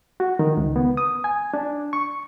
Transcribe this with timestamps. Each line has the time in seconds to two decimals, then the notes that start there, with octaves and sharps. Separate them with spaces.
0.20 F#4
0.39 D#3
0.57 C#2
0.76 B3
0.97 D#6
1.24 G#5
1.54 D4
1.93 C#6